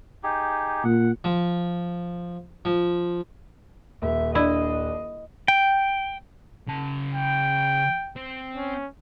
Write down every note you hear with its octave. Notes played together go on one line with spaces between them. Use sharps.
D#4 G4 G#4
A#2 F#5
F3
F3
D#1 E5
D4 E4 D#5
G5
C#3 A5
G5
C4
C#4